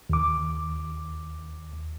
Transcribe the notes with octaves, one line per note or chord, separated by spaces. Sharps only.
D#2 D6